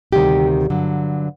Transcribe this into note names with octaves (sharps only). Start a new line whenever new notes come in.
D2 C3 D#3 G3 G4
G2 D3 F#3